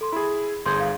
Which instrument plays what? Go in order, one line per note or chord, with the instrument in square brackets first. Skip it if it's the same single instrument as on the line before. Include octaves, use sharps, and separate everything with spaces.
[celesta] A4 C6
[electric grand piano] E4 G#4 [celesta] B5
[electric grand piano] G1 G#4 [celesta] C6 G6 G#6
[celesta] F5